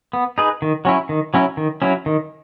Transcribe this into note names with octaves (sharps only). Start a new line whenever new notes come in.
B3
D#4 G#4 B4
D#3
F#3 C#4 E4
D#3
F#3 C#4 E4
D#3
F#3 C#4 E4
D#3